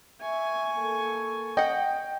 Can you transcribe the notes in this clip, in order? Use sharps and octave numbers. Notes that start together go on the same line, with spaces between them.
E5 G#5 C#6
A#3 A4
D#5 F#5 G5